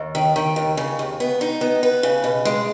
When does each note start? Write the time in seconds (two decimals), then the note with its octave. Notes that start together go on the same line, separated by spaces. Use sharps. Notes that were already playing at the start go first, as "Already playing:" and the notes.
Already playing: D#2
0.15 D#3
0.36 D#3
0.56 D#2
0.77 C#3
0.99 D#2
1.20 B3
1.41 D#4
1.61 B3
1.83 B4
2.03 C#3
2.24 B2
2.45 G#3